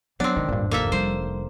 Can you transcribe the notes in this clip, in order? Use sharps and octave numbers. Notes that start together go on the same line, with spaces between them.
E3 F#3 B3 C4 D4
D3 D#3 G#3
G#1 E2 G2 A#2
F1 A#3 A4 E5
F3 G3 C5
G3